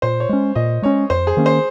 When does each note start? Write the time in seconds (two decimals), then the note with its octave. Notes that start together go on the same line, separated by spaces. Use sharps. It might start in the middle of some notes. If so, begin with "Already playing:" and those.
0.02 A#2 C5
0.20 C#5
0.29 G#3 C#4
0.55 A#2 D#5
0.82 G#3 C#4 C#5
1.10 F2 C5
1.27 G#4
1.37 D#3 A#3 C#4
1.46 C5